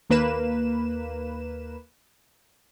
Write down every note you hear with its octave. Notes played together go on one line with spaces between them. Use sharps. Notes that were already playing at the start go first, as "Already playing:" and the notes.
D#2 A#3 B4 E7